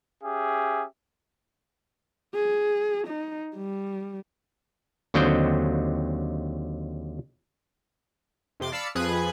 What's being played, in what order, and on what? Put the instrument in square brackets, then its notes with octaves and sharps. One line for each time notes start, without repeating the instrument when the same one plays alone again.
[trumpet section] C#4 G4 G#4 E5
[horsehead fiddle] G#4
D#4
G3
[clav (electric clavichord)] D#2 D3 F#3 C4 D#5 G5
[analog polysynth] F2 C3 C6 D6
D5 F5 A5 B5 E6 C#7
F2 F3 G#4 B4 F#6 G#6